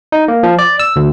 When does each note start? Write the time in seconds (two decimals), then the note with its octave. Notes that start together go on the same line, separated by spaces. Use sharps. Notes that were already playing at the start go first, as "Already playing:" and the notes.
0.12 D#4
0.28 A#3
0.43 F3
0.59 D5
0.80 E6
0.96 D2